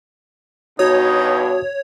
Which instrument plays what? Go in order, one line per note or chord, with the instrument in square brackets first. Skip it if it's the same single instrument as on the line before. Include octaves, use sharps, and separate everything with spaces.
[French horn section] G2 B2 [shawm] D#4 [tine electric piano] F#4 D#6 [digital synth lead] C#5